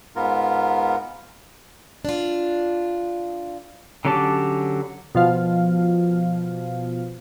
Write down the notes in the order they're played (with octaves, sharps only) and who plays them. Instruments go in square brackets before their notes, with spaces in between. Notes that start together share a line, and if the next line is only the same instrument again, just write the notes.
[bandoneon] G#2 B3 F4 A#4
[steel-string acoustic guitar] D4 F4
[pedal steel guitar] D3 F#3 C#4 G4 A5
[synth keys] B2 F3 F5